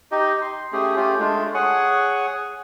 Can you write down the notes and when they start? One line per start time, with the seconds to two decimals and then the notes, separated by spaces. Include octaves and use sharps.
0.12 D#4 G4 D#5
0.42 C6
0.72 A3 C#4 G4 G#4
0.96 A3 C#4 F4 G4
1.19 G#3 A3 D4 F4
1.54 G#4 C#5 F#5 G#5